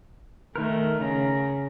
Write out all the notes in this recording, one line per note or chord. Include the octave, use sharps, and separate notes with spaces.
D#3 A3 A#4
C#3 A#5